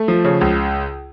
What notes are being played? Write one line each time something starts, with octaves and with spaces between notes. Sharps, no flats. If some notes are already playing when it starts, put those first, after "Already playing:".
Already playing: A3
F3
C#3
C#2